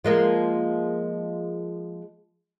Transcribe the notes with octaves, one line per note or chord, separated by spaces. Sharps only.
F3 G#3 A#3